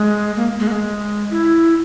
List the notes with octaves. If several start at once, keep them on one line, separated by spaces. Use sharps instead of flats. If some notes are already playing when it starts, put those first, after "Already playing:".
Already playing: G#3
A#3
G#3
A#3
G#3
E4